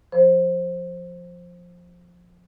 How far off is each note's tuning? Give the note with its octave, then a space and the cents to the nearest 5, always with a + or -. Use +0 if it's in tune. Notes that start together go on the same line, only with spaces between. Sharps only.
F3 +10 C5 +15